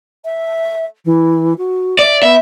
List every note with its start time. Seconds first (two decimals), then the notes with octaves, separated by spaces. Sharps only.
0.25 E5
1.05 E3
1.58 F#4
1.99 D5 E5
2.23 B3 E5